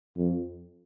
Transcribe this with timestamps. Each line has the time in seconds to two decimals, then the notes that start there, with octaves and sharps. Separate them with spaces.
0.17 F2